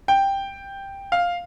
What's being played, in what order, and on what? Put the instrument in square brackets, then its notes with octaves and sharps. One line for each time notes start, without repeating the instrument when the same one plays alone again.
[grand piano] G5
F5